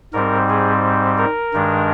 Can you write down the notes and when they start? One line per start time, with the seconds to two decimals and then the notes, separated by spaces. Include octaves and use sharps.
0.13 G#2 G3 C4 A#4
0.49 G#4
1.18 A#4
1.53 G2 D#3 G#3 D4